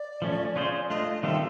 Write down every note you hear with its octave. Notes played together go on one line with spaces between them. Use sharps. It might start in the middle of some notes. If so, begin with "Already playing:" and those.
Already playing: D5
F3 A3 C#4
C#4 F4 G#4 C5
A3 D4 F4 D#5
D#3 G3 C4 F4 A4 E5